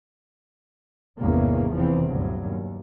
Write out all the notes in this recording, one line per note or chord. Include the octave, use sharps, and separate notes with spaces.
G#1 E2 G2 C3 A#3 C#4
F1 E2 E3 F3 C4
D2 G2 A#2 F#3
D#2